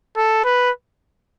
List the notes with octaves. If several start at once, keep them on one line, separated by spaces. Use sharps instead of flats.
A4
B4